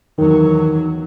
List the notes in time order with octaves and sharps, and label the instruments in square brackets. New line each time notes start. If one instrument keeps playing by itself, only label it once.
[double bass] E2 F#3 [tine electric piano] D#3